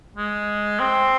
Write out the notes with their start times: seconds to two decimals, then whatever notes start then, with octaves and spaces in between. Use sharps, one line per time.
0.17 G#3
0.80 C4